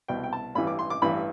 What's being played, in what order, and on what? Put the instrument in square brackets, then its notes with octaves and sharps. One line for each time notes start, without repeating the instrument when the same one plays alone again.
[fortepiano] C2 B2 G5
G5
A5
A1 G2 E3 B5
D6
C6
D6
A1 G2 E3 B5